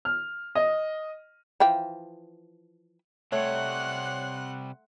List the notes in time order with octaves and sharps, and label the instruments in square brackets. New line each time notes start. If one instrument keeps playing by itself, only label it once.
[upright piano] F6
D#5
[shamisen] E3 F3 G5
[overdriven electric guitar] C3 G3 [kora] A3 [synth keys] C#5 [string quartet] F#5 C6 F#6